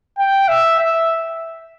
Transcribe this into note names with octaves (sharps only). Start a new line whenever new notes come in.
G5
E5
E5